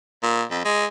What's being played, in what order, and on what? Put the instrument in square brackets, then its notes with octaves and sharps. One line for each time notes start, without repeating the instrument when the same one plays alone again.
[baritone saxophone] A#2
F2
G#3